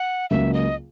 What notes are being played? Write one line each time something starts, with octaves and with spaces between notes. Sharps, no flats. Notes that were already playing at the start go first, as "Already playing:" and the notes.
Already playing: F#5
C#2 C#3 F#3 A#3 E5
D#5